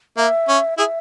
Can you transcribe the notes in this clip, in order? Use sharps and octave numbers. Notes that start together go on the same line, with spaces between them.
A#3 E5
C#4
E4 G#4 E5